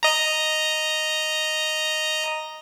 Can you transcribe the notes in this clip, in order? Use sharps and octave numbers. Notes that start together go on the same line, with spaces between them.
D#5 A#5